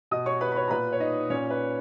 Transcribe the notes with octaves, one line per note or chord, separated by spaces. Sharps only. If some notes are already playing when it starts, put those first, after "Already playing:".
B2 D#5 D#6
C#5 C#6
B4 B5
B5
C#5 C#6
A#5
A#2 B4 B5
C#5
D#4 D#5
A#2 C#4 C#5
B4